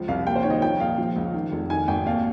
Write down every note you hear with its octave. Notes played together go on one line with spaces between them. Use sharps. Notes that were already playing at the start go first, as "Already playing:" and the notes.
Already playing: C#2 F3
C2 F5
D#2 G5
C5
D#3 C#5
D#5
F3 G5
A#1 F5
F3
C#2
D#3
F1
D#3 G#5
G#1 G5
D#2 F5